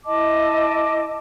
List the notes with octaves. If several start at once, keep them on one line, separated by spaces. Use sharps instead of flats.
E4 D#5 A5 D6